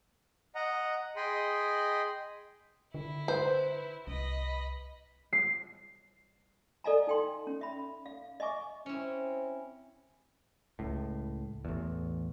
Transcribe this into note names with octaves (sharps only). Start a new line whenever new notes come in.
D#5 F#5 A#5
G#4 D#5 G5 B5 C6
D3 E4
B4 C5
C2 D#5 B5
C7
A4 D5 D#5 F5 G#5 A#5
D#4 G5 C6
C#4
E5 B5
F5
D#5 E5 G#5 C#6 D6
C4 C#4 E4
C#2 A2
A1 E2